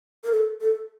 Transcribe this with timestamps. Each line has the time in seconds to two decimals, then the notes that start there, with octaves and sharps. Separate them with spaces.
0.24 A#4
0.32 A4
0.61 A4